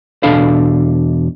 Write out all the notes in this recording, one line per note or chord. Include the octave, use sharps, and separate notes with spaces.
E2 B2 D4 A4 F5 B5